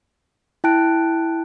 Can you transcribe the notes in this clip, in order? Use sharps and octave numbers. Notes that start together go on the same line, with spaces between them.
E4 G5 A5 F#6 D7